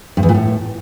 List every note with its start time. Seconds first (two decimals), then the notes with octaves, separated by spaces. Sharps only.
0.17 G2
0.23 E2
0.29 A#2
0.34 A2